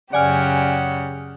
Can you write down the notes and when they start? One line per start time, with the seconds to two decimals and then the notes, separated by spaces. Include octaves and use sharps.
0.13 F#2 C#3 G4 D5 F#5 G#5 F6